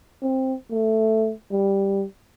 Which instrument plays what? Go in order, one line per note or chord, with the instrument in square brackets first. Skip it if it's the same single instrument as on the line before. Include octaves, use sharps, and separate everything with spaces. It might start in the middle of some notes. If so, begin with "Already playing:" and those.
[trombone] C4
A3
G3